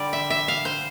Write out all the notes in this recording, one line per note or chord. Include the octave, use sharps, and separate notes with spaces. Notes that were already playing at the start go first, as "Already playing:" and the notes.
Already playing: D3 G3 D5
E5
E5
F5
C5